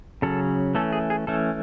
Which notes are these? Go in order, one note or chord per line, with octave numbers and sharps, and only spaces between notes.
C#3 F#3 C#4 A4
E3 A3 C#4 A4
G#4
G#4
E3 A3 C#4 A4